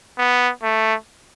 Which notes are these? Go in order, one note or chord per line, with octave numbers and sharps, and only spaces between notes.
B3
A3